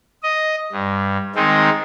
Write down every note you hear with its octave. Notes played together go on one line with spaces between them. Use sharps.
D#5
G2
D#3 G#3 C4 D#4